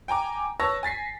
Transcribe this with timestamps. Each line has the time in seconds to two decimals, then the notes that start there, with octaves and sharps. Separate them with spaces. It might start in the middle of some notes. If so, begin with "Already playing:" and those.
0.08 G5 G#5 A#5 D6
0.60 B4 C#5 A5 C#6 E6 A#6
0.83 G#5 A6 B6 C7